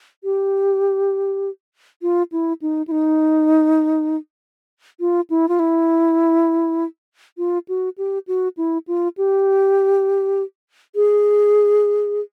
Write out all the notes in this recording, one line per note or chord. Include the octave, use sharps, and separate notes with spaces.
G4
F4
E4
D#4
E4
D#4
F4
E4
F4
E4
F4
F#4
G4
F#4
E4
F4
G4
G#4